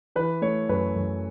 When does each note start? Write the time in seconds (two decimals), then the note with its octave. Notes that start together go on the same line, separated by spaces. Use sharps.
0.16 E3 B4
0.42 A3 C#5
0.69 F#2 B4
0.96 F#2